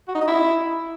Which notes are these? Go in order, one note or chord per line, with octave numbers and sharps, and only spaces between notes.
F#4
D#4
D#5
E4